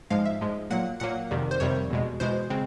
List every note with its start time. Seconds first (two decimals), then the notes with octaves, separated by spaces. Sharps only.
0.10 G#2 F3 G#3 F5
0.25 E5
0.41 G#2 F3 G#3
0.70 A#2 F#3 A#3 F#5
1.00 A#2 F#3 A#3 F#5
1.31 F2 C3 D#3 G3
1.51 C5
1.60 F2 C3 D#3 G3 C#5
1.90 E2 B2 G#3
2.20 E2 B2 G#3 C5
2.50 C#3 G#3 C4